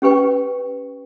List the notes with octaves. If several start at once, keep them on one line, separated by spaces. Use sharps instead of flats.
C#4 G4 B4 G5 C#6